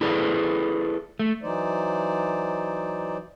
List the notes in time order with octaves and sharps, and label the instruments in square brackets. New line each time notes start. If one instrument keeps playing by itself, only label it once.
[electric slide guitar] E4 G#4 A4 B4 D5
A3
[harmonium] E3 F#3 D#4 C5 D5